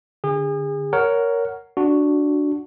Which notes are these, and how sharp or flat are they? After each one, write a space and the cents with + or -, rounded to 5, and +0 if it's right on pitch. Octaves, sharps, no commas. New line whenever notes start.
D3 +0 G#4 -35
A#4 +0 C#5 +15 F#5 +0
D4 +0 F#4 +0